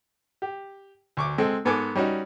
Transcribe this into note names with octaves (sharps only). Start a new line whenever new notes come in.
G4
D2 C#6 D6
G#3 C4 A4
G#2 B3 A4 A#4 G#5 D6
G3 C#4 D#4 F#4